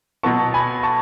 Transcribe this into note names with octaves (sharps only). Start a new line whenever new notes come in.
B2 F#3 B3 A5 C#6
G#5 B5
A5 C#6